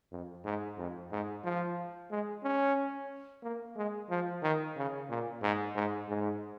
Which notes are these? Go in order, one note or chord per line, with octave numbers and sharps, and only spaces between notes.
F2
G#2
F2
G#2
F3
G#3
C#4
A#3
G#3
F3
D#3
C#3
A#2
G#2
G#2
G#2